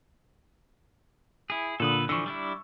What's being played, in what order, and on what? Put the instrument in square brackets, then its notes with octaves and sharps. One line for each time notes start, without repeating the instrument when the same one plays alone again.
[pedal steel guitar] E4 G#4
[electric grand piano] A#2 D3 D#6 [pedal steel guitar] A4 B4
[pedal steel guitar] D3 E3 F3 [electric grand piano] C#6 E6
[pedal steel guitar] G3 D4 E4